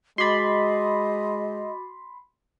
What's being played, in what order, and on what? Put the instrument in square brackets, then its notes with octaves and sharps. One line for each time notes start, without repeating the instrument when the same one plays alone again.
[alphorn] G#3 [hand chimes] F#4 D6 A6 [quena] D#5 [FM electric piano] B5 C6